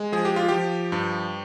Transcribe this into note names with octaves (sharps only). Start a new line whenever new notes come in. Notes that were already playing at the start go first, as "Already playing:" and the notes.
Already playing: G#3
F3 G#4
G4
F4
F3 G4
G2